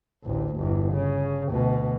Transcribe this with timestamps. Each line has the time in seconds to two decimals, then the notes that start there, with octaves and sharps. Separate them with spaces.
0.23 A1 D2
0.56 G1 E2
0.92 C#3
1.50 D2 B2